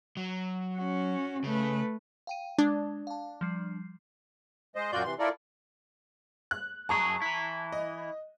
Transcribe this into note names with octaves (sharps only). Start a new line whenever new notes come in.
F#3
C#4 F#4
C#3 A3 B4
F5 G5 D#7
G#3 D4
F5 A5
F3 G3 C7
G#3 C5 D#5
F#2 A#2 F4 F#4 D5 G6
C3 E3 C6
E4 F4 A4 A#4 D5
F#6
F#2 F#3 G#4 A5 A#5 C#6
E3 E4
D#5